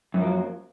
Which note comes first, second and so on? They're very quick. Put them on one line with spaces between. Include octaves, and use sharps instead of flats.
F#2 F3 A#3 F#3